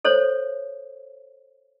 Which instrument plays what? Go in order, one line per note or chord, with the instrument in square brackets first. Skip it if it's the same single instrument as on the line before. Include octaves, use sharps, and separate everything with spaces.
[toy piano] A4 C5 C#5